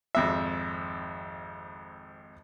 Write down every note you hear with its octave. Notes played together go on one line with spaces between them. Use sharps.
G#1 F2 E5